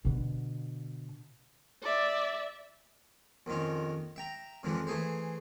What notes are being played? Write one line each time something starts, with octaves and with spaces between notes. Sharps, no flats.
B2 D3
D5 E5
A#1 F2 D#3 C#4
E5 G5 A#5
F2 G#2 D3 E3 F3
E3 A3 G#4 C5